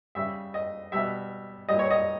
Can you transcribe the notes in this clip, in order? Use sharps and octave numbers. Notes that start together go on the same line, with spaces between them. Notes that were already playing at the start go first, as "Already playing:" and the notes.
C#3 G3 E5
D#5
B2 G3 E5
A#2 G3 D#5
C#5
D#5